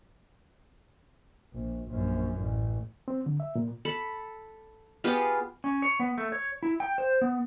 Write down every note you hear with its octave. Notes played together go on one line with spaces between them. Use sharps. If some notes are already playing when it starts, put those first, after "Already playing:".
A#1
A#1 F#2
A1
C4
D3
E5
A#2
A4 B5
B3 F4 G4 G#4
C#4
C#5
B3
A3
C#5
E4
G5
C5
B3